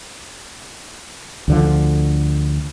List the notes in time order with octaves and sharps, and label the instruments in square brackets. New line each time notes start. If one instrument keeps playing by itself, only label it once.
[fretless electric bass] D2 D3 F3